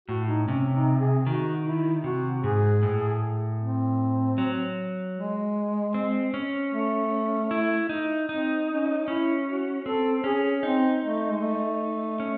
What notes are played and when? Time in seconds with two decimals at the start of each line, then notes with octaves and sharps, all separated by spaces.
0.08 A2 F#4
0.28 D#4
0.48 C3 C#4
0.74 D#4
1.00 G#4
1.26 D#3 F#4
1.66 E4
2.04 C3 F#4
2.42 G#2 G#4
2.83 A2
3.60 C4
4.38 F#3
5.17 G#3
5.94 C4
6.34 C#4
6.73 A3
7.51 E4
7.89 D#4
8.29 C4 D#4
8.68 C#4
9.07 C#4 E4
9.47 F#4
9.85 C4 A4
10.24 C#4 G#4
10.63 C4 D#4
11.02 A3
11.31 G#3
11.42 A3
12.20 C#4